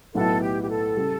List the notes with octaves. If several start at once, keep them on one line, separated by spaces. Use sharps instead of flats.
B1 A2 F#3 B3 E4 A4
G4
G4
A4
C#3 G3